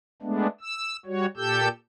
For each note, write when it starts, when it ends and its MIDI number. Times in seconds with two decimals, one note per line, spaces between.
0.22 0.47 56
0.22 0.47 57
0.22 0.47 59
0.22 0.47 62
0.61 0.97 88
1.06 1.26 55
1.06 1.26 66
1.06 1.26 73
1.37 1.68 46
1.37 1.68 67
1.37 1.68 69
1.37 1.68 88
1.37 1.68 91